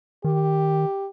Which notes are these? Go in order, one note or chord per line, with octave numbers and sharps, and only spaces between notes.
D#3 G4